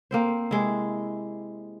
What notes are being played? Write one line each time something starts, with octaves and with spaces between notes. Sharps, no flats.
A#3 C4 C5
C3 G#3 E4